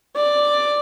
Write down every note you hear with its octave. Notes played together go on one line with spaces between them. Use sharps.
D5